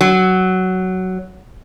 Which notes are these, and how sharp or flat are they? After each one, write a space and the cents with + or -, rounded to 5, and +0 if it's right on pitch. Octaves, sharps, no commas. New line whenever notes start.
F#3 +10